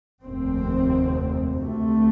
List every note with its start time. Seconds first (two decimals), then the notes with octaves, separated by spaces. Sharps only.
0.23 F1 D#2 C4
1.60 D2 C3 A3